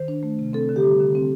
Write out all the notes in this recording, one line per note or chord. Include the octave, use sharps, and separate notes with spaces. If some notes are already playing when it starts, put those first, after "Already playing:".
Already playing: D#3 C5
D4
A3
C3
C4 A4
D3
G4
G3
D3
C4